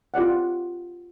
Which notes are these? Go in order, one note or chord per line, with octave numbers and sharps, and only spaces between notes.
F4 G4 D5 F#5